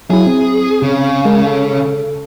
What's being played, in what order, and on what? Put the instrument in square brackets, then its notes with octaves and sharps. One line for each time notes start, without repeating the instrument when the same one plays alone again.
[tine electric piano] F#3 E4 [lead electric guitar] G#4
[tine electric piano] C4
[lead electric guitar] C#3
[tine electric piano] G#3 A#4
A4